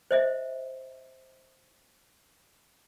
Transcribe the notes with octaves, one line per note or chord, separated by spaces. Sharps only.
C5 D#5 E5